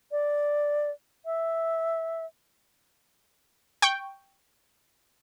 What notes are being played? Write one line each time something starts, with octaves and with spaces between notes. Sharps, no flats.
D5
E5
G5 C#6 G6